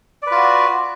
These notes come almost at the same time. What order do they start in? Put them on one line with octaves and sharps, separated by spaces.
D5 B4 F4 F#4